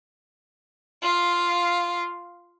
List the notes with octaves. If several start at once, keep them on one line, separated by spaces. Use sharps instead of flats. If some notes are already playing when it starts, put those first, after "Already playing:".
F4 F5